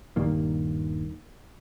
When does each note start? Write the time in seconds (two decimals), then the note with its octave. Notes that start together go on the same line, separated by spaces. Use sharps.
0.16 D#1 G2 D#3 A#3